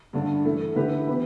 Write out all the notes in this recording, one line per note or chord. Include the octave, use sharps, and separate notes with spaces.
G2 D3 A3 D4
E3 A3 E4 A4
D3 A3 E4 G4 B4
E3 B3 G4 B4